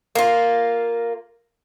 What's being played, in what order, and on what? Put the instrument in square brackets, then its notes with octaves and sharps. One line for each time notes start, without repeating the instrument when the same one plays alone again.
[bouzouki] A#3 F4